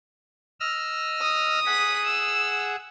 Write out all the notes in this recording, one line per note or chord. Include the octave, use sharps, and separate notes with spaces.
D#5 E6 F6
D#6
G#4 F#5 B6 D#7
E6